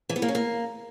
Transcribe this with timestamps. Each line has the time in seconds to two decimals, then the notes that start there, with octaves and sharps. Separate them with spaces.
0.09 E3
0.16 B3
0.22 A#3
0.28 C#4
0.35 A#3